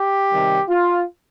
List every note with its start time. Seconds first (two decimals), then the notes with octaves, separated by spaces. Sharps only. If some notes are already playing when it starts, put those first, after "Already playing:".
Already playing: G4
0.32 C3 D#3 G3
0.69 F4